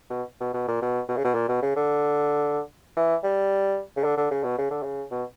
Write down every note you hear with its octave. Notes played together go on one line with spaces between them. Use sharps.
B2
B2
B2
A#2
B2
B2
C#3
B2
A#2
B2
C#3
D3
E3
G3
C#3
D3
D3
C#3
B2
C#3
D3
C#3
B2